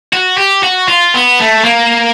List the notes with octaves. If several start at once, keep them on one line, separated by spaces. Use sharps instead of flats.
F#4
G4
F#4
F4
B3
A3
A#3